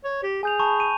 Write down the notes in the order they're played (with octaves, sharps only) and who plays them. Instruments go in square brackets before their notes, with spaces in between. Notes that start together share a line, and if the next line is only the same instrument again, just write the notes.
[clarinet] C#5
G4
[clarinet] G#4 [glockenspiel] G#5 G6 F7
[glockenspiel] A5 B5 C#6
D#7